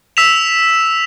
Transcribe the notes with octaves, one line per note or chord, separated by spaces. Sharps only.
E6 B6 E7 F7